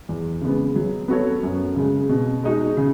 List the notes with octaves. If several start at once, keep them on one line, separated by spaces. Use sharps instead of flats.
E2
C#3 G#3 B3
F#3
B3 F#4 A4 C#5
F#2
C#3 G#3
B2
G#3 D#4 F#4
C#3